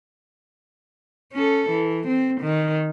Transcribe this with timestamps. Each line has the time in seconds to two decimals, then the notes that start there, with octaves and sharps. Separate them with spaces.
1.33 C#4 A4
1.70 E3
2.07 C4
2.41 D#3